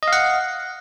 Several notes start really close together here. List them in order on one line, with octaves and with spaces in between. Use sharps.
D#5 F5 F#5